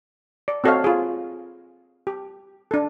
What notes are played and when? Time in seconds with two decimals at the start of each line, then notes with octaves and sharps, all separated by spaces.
0.48 D5
0.64 C4 F#4 A4 C#5 D#5 F5
0.84 F4 G#4
2.07 G4
2.71 D4 A4